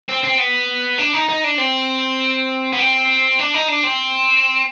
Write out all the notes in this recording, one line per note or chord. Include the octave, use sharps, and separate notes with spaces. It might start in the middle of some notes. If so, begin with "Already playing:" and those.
C4
C4
B3
D4
D#4
D#4
D4
C4
B3
C4
D4
D#4
D4
C4